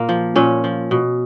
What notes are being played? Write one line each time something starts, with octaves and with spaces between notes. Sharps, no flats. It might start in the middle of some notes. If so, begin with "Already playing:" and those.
Already playing: A#2 A#3
F3
A#2 C#4
F3
B2